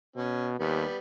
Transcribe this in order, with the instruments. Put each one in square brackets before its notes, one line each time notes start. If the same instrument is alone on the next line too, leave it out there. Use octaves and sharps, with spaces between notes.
[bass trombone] B2 [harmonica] C#4
[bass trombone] D#2 [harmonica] G3 B3